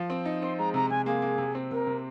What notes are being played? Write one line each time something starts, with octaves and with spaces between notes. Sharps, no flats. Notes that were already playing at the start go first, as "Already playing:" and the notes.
Already playing: F3
C4
D#4
C4 C6
G#3 A#5
C3 A#5
C3 G#5
A#3 G#4
A#3
C3
C4
C3 A#4
C3